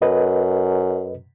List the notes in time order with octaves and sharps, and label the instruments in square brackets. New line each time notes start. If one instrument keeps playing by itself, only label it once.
[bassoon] F#2 [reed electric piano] A4 B4 D#5